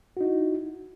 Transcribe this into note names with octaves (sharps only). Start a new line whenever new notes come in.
D#4 E4 F#4